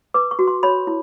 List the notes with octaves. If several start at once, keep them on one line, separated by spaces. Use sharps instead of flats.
B4 D6
C#6
F#4
C6
C#5 B5
E4